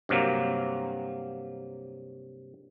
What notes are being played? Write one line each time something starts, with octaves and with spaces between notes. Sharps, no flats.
G2 C3 F#3 A#3